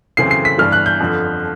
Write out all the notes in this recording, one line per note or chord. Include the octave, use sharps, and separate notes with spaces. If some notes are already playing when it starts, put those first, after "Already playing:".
F#2 C#3 E3 A3 C4 C7
C7
B6
G1 G2 E3 F6
F#6
G6
G1 F2 D3 F3